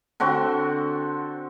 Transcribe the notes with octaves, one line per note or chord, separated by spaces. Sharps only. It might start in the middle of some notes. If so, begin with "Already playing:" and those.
D3 C4 F#4